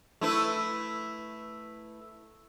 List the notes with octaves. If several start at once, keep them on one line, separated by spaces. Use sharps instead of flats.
A3 E4 B4